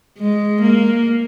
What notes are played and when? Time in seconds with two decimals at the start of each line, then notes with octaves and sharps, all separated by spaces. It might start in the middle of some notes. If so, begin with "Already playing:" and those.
0.19 G#3
0.61 A#3